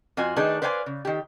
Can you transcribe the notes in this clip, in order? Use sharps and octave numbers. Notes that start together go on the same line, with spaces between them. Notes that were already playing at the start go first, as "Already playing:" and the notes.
F2 F4 F#4 G#5
D#3 A3 D4 D#4 G#4 B4
B4 C5 D5 F5 G5 G#5
C#3
D#3 G4